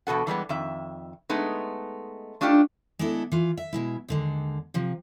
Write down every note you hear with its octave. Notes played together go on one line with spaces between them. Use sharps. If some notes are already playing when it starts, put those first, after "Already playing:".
E2 B2 A4 F#5
E3 G3 G#3 B3
F2 D#3 E5
G#3 A3 B3 D#4
A3 D4 D#4 F4 G4
G#3 B3 D4 E4 A4
E3 F4
E5
B2 G#3 E4
D#2 D3 G#3
C3 F3